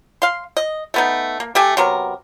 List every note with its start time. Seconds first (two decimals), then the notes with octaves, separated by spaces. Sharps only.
0.22 F5 C6
0.57 D#5
0.94 A3 B3 D#4
1.40 A#3
1.55 A3 G4 E5 G#5
1.77 C3 F#3 B3 A#4